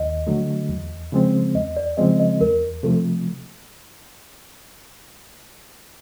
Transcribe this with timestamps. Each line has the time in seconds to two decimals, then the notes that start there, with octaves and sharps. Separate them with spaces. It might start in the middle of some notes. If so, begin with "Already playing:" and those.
Already playing: D#2 D#5
0.27 D3 F#3 A3
0.69 E2
1.12 C#3 F3 G#3 C4
1.55 E2 D#5
1.77 D5
1.97 C#3 F3 G#3 C4 D#5
2.20 D#5
2.41 E2 A#4
2.83 C3 F3 A3 A4